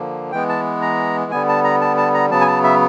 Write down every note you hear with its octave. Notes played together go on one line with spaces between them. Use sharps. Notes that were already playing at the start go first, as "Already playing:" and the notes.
Already playing: D3 F3 A#3
E3 G#3 B3 G5
A5
A#5
D3 G3 B3 G#5
A5
A#5
A5
A5
A#5
C#3 F#3 B3 A5
G#5
A5
E5